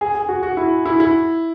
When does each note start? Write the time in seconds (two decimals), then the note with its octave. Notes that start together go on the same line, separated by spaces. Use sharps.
0.01 G#4
0.15 G#4
0.29 F#4
0.43 F#4
0.57 E4
0.86 E4
1.00 E4